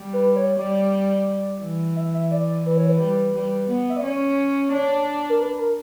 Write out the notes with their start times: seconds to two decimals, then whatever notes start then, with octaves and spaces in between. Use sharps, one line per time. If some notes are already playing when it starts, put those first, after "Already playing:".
Already playing: G3
0.13 B4
0.36 C#5
0.58 G3 D5
1.62 E3
1.96 E5
2.14 E5
2.31 D5
2.48 D5
2.65 E3 B4
2.77 C#5
2.89 B4
3.01 G3
3.35 G3
3.69 B3
3.90 E5
3.96 D5
4.03 C#4 C#5
4.72 D4
5.29 A#4
5.41 B4
5.59 A#4